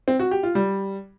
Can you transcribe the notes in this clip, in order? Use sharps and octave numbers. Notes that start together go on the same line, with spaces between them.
C4
F#4
G4
F4
G3